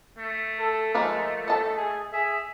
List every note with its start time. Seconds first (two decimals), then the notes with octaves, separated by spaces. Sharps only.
0.18 A3
0.59 A4
0.95 F3 G#3 A#3 D#4
1.48 A4 D#5 A5
1.76 G#4
2.13 G#4 E5